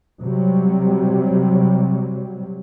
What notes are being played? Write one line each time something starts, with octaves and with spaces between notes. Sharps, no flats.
C3 F#3 G3